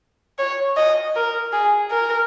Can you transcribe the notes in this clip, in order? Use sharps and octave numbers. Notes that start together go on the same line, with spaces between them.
C#5
D#5
A#4
G#4
A#4